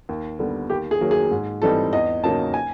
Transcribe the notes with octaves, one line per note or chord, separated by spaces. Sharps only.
D#2
D3 G3 B3
D#2 G4
G#4
D#3 F#3 A#3
G#4
G#2
E3 G3 C4 D#4 A4
E2 D#5
C#3 F#3 A#3 D#4 A5
G#5